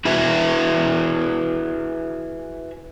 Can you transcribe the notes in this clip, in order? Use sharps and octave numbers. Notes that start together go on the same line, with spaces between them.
E4 F#4 G#4 B4 E5